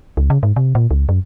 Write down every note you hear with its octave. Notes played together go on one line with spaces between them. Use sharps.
C#2
C#3
G#2
C3
A#2
C#2
F#2